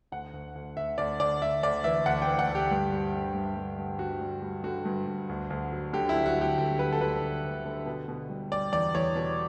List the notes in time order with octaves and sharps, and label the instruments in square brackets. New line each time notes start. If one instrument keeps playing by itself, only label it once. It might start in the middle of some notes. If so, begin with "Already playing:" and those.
[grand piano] D2 F#5
D2
D2
D2 E5
D2 D5
D2 D5
D2 E5
D2 D5
E3 E5
D2 F#5
G5
E3
F#5
D2
G4
G2
G3
D3
G2
G2
G2
D3 F#4
G3
G3
D3 F#4
G2
G2
D2
D2
F#3
D3 G4
E4
F#3
F#4
D2 G4
D3 G4
D2 B4
A4
D2 B4
D2
D2
D3
B2
B2
G3
G3 D5
E2 D5
E2 C#5
B2